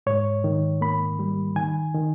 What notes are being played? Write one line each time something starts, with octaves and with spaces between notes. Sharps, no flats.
G#2 C#5
D#3
A#3 B5
G3
D#3 G#5
D#3